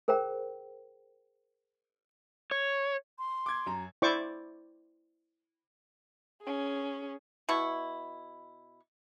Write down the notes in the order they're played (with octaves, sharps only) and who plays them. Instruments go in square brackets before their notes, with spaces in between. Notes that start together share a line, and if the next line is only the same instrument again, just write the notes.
[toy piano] G#4 A#4 C5 G5 A#5
[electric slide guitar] C#5
[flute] C6
[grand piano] D6 G#6
F#2 A#5
[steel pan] E4 C5 D5 C#6 D6
[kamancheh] C#4 G#4
[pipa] B2 E4 C#6